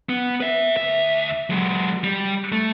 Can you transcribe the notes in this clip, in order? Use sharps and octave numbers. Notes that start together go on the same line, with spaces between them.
B3
B4 E5
D2 E5
F#3 G#3
G3
A3